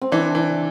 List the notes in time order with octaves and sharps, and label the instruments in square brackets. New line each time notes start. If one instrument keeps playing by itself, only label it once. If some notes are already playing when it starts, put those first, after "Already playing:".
[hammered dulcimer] C4
[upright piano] E3 [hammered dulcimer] D4
[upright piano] E3